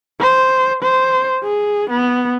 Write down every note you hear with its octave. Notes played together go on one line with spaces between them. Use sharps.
C5
C5
G#4
B3